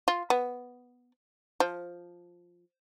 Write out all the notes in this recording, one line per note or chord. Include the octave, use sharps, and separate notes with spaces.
F4
B3
F3